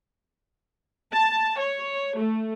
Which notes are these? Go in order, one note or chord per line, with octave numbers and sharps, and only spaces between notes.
A5
C#5
A3